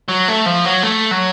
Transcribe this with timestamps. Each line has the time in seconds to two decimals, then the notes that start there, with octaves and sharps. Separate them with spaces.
0.08 F#3
0.28 A3
0.46 F3
0.65 F#3
0.83 A3
1.11 F#3